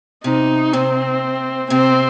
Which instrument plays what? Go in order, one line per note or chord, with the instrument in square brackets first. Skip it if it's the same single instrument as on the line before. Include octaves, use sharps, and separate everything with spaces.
[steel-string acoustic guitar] C3 [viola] D#4
[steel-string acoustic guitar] C3 [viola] C4
[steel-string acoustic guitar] C3 [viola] C4